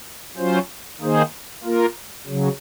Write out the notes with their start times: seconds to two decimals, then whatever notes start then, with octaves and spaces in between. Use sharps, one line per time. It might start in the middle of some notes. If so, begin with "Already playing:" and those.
0.37 F#3 C#4 F4 C5
1.01 D#3 A#3 D#4 G#4 C5
1.63 A#3 F4 A#4
2.27 C#3 F#3